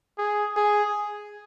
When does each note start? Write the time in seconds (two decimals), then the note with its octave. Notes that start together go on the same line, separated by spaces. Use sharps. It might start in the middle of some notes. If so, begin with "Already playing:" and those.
0.18 G#4
0.56 G#4